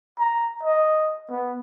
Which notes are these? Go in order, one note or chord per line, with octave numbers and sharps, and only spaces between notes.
A#5
D#5
B3